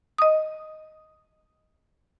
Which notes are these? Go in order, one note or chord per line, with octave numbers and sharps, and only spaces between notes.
D#5 D#6